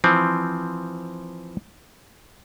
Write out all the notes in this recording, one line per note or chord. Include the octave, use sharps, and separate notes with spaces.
E3 F3 C4